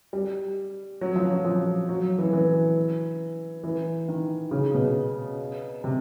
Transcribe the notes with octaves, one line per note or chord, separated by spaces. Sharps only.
G3
F#3
F3
F#3
F3
F#3
E3
E3
E3
D#3
C#3
B2
C3